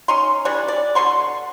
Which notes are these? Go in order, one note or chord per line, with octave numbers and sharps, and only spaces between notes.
C#4 D#4 C6
E3 G3 C#4 D4
D5
B2 D3 C6 C#6